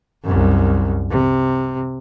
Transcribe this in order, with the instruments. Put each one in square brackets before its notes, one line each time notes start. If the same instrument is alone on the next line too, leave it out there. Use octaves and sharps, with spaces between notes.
[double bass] C2 F#2
C3